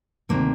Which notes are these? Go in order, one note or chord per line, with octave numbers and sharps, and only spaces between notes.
D2 C3 D#3 A#3